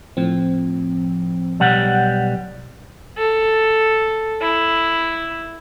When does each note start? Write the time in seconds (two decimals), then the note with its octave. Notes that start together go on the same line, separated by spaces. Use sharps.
0.17 A2 F3 C4
1.60 B1 G3 F#5
3.17 A4
4.41 E4